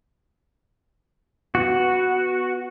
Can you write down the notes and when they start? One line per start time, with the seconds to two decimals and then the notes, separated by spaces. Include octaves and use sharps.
1.55 B3 F#4